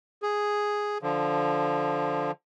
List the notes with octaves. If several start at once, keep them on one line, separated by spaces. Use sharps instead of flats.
G#4
D3 F3